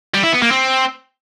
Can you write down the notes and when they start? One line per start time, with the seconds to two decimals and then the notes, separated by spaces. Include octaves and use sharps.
0.14 G3
0.23 E4
0.33 B3
0.42 A#3
0.51 C4